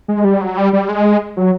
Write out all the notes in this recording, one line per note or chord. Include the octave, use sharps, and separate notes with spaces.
G#3
G3
F#3
G3
G3
G#3
F#3